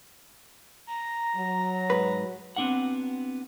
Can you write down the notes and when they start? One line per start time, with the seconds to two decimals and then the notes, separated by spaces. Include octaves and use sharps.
0.87 A#5
1.36 F#3
1.90 G#2 B4
2.56 B3 C4 D4 F#4 F#5